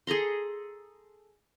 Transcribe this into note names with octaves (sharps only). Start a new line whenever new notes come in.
G#4 A4 A#5 C6